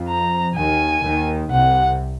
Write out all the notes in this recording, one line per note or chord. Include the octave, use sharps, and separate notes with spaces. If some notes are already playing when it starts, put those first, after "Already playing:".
Already playing: F2 F3
A#5
D#2 D#3 G#5
D#2 D#3
C2 C3 F#5